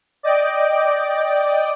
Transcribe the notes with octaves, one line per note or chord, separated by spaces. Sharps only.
D5 D#5 G5 D6